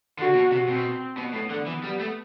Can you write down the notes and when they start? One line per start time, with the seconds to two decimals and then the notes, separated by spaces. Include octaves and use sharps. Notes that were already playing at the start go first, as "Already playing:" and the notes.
0.19 D3 F#4
0.35 B2
0.51 C3
0.68 B2 C4
1.18 B2 B3
1.34 A2
1.50 D3
1.67 E3 B3
1.84 G3
2.00 A3